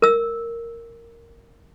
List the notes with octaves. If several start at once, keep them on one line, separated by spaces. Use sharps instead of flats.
A#4 E6